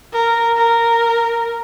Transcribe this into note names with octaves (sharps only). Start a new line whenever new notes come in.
A#4
A#4